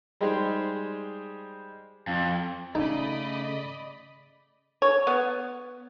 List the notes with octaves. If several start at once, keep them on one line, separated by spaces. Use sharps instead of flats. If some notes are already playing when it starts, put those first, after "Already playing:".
G3 G#3 D#4 G4 G#4 C5
F2
C#3 A3 D#4 D5 D#5 B5
C#5
B3